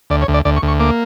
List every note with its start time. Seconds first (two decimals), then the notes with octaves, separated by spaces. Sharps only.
0.10 D2 D5
0.22 C#5
0.28 D2
0.34 D5
0.45 D2 D5
0.56 C#6
0.63 D2
0.68 C#6
0.80 A#3 D6